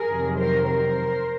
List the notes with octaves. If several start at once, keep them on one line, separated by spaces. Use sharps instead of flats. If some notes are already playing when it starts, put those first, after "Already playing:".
Already playing: G#4 A#4
F2 C3 D#3 F#3
A#4 C5
A#4 C5